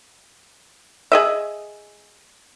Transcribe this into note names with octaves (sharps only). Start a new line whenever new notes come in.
G#4 D#5 E5